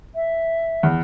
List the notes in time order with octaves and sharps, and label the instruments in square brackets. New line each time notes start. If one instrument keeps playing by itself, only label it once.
[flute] E5
[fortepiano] E2